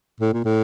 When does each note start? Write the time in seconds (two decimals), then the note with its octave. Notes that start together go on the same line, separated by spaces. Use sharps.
0.21 A2
0.33 A#2
0.45 A2